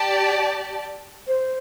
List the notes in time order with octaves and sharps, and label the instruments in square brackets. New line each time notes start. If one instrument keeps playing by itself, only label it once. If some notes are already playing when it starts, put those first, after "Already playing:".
Already playing: [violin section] G4 D5 A5
[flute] C5